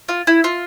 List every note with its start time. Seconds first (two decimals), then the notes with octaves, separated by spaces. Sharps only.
0.09 F4
0.27 E4
0.44 F4